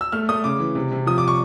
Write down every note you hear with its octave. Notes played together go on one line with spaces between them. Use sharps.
E6
A3 F6
A3 D#6
C#3 D6
E3
C3
C3
F3 D#6
D6
C#6